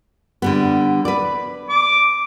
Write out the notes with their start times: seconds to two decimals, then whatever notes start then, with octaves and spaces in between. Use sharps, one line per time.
0.42 D3 G3 B3
1.05 B4 D5
1.70 D6